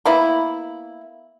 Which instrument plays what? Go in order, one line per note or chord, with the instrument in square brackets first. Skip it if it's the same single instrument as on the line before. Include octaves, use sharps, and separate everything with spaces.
[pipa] A#3 B3 E4